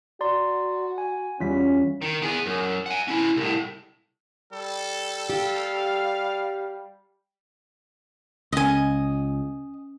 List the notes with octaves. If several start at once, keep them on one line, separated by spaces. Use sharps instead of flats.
F#4 D5 A#5 C6
G#5
E2 G3 C#4 F4 B6
D#3
B3 G#4
F#2
F#5 G#5
C#4 E4
C2 A2
G3 A4
G4 F5
C#2 C#4 D#5 G#5